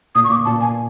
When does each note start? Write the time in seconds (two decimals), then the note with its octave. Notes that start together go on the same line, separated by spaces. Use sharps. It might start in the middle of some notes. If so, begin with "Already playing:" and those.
0.15 A#2 D#6
0.24 C#6
0.29 A#2 D6
0.45 A#2 A5
0.61 G#5